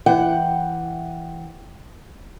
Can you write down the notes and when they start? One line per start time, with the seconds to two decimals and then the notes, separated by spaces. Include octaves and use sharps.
0.06 E3 F#5 G5